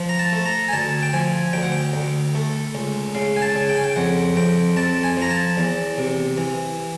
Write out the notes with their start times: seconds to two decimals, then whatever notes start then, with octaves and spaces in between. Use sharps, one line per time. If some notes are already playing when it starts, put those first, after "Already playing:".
Already playing: F3
0.09 A#5
0.19 A5
0.33 A3
0.46 A#5
0.68 G#5
0.73 D2 A5
1.02 G5
1.13 F3 G#5
1.53 D2 G5
1.62 F#5
1.72 G5
1.93 D2
2.35 A3
2.75 C#2
3.15 C#3 F5
3.36 G#5
3.42 A5
3.55 C#3
3.69 G5
3.76 G#5
3.84 G5
3.96 F2 F#5
4.36 F2 G5
4.77 F2 A5
5.04 G#5
5.17 F3 A#5
5.31 A5
5.57 E2
5.98 C3
6.38 E3